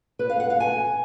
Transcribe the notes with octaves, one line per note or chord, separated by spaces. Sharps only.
B4
F5
F#5
F5
G#5